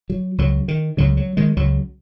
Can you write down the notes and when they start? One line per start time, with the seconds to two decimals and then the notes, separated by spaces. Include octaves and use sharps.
0.10 F#3
0.38 C#2 C#3 F#3
0.68 D#3
0.97 C#2 C#3 F#3
1.17 F#3
1.37 D#3 G#3
1.57 C#2 C#3 F#3